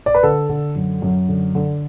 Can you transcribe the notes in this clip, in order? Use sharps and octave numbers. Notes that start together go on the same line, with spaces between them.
D5
B4
D3 A4
D3
F#2
F#2
D3
D3